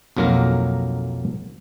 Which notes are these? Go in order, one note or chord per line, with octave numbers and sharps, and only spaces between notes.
B1 F2 F#3 A#3 A#4 A#5